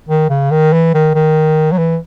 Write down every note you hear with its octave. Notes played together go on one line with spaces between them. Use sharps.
D#3
C#3
D#3
E3
D#3
D#3
F#3
E3